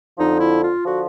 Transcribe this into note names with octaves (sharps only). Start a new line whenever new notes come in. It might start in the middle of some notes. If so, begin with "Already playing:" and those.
F2 D3 F3 D#4
E4
F4
D3 F3 F#4